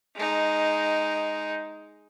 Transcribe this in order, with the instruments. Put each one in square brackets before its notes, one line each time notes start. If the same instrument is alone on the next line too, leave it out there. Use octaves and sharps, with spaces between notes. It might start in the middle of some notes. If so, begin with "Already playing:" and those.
[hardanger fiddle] G#3 D#4